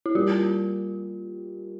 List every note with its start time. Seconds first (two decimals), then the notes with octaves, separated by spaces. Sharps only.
0.06 E4
0.15 G3 A#3 C#4 F4 G4